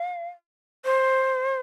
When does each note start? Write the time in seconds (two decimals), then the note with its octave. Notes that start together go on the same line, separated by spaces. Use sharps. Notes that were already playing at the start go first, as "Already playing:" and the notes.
Already playing: F5
0.85 C5